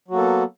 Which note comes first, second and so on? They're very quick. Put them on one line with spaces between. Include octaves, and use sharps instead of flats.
F#3 F#4 A#3 A4 B3